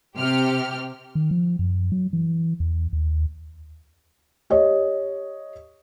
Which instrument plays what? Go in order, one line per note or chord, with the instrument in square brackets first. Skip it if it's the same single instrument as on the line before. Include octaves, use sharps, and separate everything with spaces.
[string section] C3 G4 F6
[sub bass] D#3
F3
F#2
F#3
E3
E2
D#2
[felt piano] G4 C#5 D#5